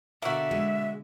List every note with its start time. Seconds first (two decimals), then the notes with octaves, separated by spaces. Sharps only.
0.22 B2 D3 A#3 F#4 E5
0.51 G#3